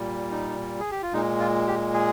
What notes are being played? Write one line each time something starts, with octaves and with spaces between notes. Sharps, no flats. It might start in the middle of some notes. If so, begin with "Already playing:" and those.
Already playing: A#2 G3
D#4
G#4
G4
F4
A#2 G#3 D#4
F4
G4
G#4